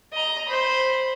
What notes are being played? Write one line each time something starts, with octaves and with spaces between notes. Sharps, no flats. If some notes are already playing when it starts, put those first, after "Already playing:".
D#5 A#5
C5 B5